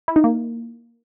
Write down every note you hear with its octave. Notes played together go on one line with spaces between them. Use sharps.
E4
D#4
A#3